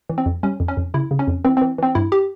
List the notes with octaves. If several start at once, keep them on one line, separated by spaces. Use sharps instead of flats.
E3
C4
F2
G3 C#4
F2
C#4
F2
C#3 E4
C#3
C#4
F2
E3 C4
E3 C4
E3 C4
G2 E4
G4